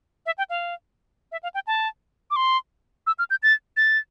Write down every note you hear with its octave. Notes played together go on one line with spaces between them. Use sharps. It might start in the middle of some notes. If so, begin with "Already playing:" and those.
E5
G5
F5
E5
F5
G5
A5
D6
C6
E6
F6
G6
A6
A6